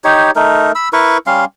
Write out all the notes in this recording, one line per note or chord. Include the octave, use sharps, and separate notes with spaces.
D#4 G4 C#5
A3 D#4 A#4
B5 E6
E4 A#4 B4 C#6
G3 C#4 F5 C6